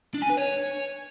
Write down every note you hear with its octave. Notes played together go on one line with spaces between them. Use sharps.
D4
G#5
B4
C#5